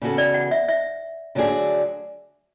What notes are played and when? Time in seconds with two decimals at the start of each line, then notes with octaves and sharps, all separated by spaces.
0.02 C#3 E3 B3 F#4 A4
0.18 D5
0.34 F#5
0.51 E5
0.68 E5
1.35 D3 F#3 A3 D4 G#4